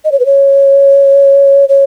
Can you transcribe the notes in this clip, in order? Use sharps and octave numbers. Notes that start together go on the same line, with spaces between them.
D#5
C#5
B4
C#5
C#5